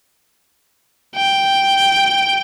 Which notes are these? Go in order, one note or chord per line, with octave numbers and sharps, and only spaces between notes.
G5